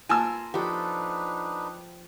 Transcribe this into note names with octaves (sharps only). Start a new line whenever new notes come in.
A#3 F4 A#4 G#5 A5 E6
F3 D4 D#4 G4 A4 B4